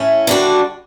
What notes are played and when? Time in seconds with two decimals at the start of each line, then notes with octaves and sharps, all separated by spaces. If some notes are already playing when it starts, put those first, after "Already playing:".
Already playing: A2 C#4
0.27 D3 G3 D4 F#4